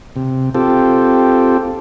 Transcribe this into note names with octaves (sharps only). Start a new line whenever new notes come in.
C3
C4 F4 G4 A4